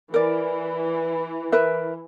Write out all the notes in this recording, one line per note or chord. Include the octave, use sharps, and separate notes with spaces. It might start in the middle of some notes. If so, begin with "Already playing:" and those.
E3 A#4 D5
A#4 B4 E5